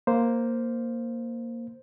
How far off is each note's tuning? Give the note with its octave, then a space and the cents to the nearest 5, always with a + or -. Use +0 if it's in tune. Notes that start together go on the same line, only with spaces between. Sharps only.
A#3 +0 C5 +0